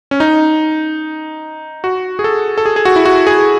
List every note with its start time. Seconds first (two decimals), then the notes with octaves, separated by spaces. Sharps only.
0.11 C#4
0.20 D#4
1.84 F#4
2.19 G#4
2.24 A4
2.58 A4
2.66 G#4
2.76 G#4
2.85 F#4
2.96 E4
3.05 F#4
3.27 G#4